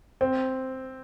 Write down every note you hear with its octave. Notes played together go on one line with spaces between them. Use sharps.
C4